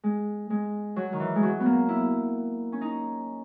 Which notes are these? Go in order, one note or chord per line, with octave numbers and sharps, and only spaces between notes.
G#3
G#3
F#3
D#3
E3
G#3
F#3
B3
A#3
E4
C#4
D#4